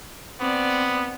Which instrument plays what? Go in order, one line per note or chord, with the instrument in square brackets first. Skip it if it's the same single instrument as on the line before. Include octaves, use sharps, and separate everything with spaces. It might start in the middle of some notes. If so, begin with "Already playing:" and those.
[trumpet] B3 [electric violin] C4 D5